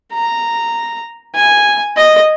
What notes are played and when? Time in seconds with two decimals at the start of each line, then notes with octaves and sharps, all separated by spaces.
0.13 A#5
1.35 G#5
1.97 D#5